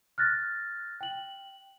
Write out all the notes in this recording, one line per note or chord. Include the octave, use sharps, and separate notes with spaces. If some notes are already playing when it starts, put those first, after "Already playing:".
F6 F#6 A6 A#6
G5 F#7